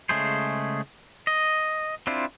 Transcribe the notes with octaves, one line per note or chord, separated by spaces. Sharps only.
C#3 G#3 A3 G#4 C5
D#5
C4 D4 E4 F4